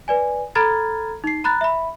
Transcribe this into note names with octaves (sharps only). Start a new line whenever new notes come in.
B4 D5 G#5
A4 A#5 B5 F6 G#6 A6
D#4 C7
A#5 B5 F#6 A6
E5 B5